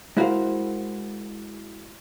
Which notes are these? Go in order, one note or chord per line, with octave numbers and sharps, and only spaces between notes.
G#3 E4 F#4 A#4 C5 F5